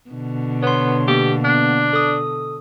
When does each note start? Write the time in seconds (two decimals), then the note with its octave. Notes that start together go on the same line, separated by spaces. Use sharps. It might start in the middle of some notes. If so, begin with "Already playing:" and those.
0.10 B2 D3
0.63 B3 C#5 C6
1.08 A#3 B3 G4
1.44 D4
1.93 A4 D#6